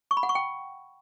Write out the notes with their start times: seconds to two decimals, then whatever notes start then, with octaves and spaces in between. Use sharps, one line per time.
0.11 C#6
0.17 B5
0.23 F#5
0.29 C#6
0.35 G5